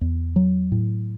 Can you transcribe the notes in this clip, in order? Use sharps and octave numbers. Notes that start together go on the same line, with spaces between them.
E2
F#3
A2